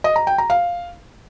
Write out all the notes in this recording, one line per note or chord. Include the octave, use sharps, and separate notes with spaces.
D#5
A#5
G5
A#5
F5